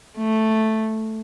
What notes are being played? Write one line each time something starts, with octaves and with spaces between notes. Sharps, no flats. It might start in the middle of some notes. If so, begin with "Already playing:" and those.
A3